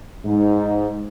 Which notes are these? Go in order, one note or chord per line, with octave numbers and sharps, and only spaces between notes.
G#2 D#4